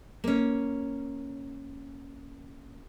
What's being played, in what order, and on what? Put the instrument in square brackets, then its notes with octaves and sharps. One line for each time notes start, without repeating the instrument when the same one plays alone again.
[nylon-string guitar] A#3 C#4